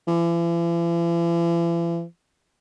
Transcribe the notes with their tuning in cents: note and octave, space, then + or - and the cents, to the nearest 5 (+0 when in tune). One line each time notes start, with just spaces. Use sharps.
E3 +45